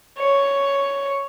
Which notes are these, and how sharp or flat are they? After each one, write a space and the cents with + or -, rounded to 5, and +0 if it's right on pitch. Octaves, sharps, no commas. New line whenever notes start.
C#5 +5